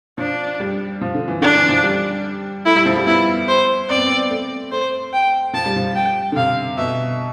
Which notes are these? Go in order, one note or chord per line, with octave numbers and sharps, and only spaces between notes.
F3 D4
G3
F3
D3
E3
D3 D4
E3
F3
G3
A3 E4
G3
F3
G3
B3 E4
C5
C4 D5
B3
C4
A3
A3 C5
G5
F3 A5
G3
F3
G5
D3
C3 F5
B2 E5